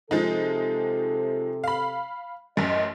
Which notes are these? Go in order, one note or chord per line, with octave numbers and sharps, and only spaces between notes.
C3 F3 G#3 D#4 A4
F5 B5
A1 F#2 D#5